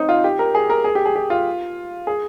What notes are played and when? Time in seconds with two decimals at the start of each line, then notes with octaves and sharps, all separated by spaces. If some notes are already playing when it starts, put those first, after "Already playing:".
Already playing: C4 D#4
0.09 F4
0.24 G4
0.39 A#4
0.55 G#4
0.70 A#4
0.84 G#4
0.95 G4
1.06 G#4
1.16 G4
1.30 F4
2.07 G#4